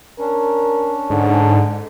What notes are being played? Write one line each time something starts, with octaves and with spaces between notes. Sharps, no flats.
C#4 D4 A#4
G#2 D3